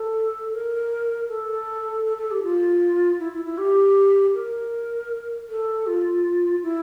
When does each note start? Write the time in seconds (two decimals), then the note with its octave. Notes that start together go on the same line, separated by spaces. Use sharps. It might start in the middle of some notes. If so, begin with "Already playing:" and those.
Already playing: A4
0.53 A#4
1.29 A4
2.05 A4
2.18 A4
2.31 G4
2.43 F4
3.20 E4
3.33 E4
3.45 E4
3.58 G4
4.34 A#4
5.49 A4
5.87 F4
6.63 E4